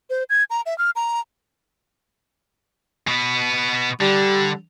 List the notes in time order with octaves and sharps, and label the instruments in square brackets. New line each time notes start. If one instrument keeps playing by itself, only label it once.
[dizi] C5
G#6
A#5
E5
F6
A#5
[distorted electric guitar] B2 B3
[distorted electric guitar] D3 [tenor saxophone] G3